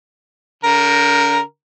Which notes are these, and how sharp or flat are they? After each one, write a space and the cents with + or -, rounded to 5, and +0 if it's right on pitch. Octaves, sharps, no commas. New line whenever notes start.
D3 -45 A#4 +0